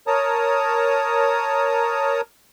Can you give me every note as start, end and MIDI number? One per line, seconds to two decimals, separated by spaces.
0.07 2.21 70
0.07 2.21 73
0.07 2.21 81
0.07 2.21 82
0.07 2.21 87